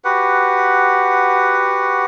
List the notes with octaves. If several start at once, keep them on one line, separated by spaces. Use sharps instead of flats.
F#4 G4 B4 F#5